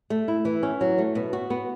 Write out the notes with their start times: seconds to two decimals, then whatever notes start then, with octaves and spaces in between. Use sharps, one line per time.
0.10 A3
0.28 E4
0.45 E3
0.63 C#4
0.81 F#3
0.98 A3
1.15 B2
1.33 F#4
1.50 B3